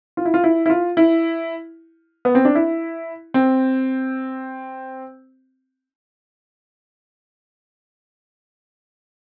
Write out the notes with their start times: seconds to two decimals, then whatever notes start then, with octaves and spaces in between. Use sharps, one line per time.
0.17 F4
0.25 E4
0.34 F4
0.44 E4
0.66 E4
0.70 F4
0.97 E4
2.25 B3
2.35 C4
2.45 D4
2.55 E4
3.34 C4